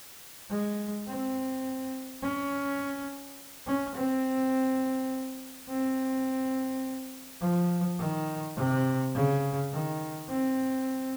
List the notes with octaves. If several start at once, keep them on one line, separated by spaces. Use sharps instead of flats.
G#3
C4
C#4
C#4
C4
C4
F3
D#3
C3
C#3
D#3
C4